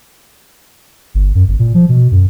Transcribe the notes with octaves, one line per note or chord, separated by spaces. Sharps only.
G1
F#2
G1
A#2
F3
B2
F#2